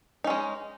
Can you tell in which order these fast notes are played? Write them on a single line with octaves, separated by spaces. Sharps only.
D#4 C#4 G#3